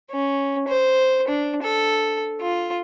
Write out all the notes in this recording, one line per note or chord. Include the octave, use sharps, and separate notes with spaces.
C#4
C5
D4
A4
F4